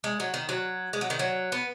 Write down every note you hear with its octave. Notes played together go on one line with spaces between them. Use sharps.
G#3
F#3
D#3
F#3
G#3
F#3
D#3
F#3
B3